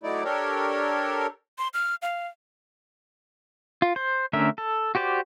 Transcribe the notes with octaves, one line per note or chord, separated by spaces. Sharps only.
F#3 A3 D#4 E4 D5
D4 G4 A4 A#4 C#5
C6
F6
F5
F4
C5
D3 A3 C#4 A#4 E5
A4
F#4 G4 C5 D5